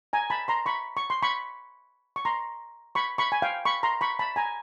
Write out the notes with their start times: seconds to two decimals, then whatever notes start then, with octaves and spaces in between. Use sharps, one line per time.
0.13 G#5 A#5
0.30 A5 B5
0.48 A#5 C6
0.66 B5 C#6
0.97 C#6
1.10 C6
1.23 B5 C#6
2.16 C#6
2.25 A#5 C6
2.95 B5 C#6
3.18 B5 C#6
3.32 G#5
3.42 F5 G5
3.65 B5 C#6
3.83 A#5 C6
4.01 B5 C#6
4.19 A5 B5
4.36 G#5 A#5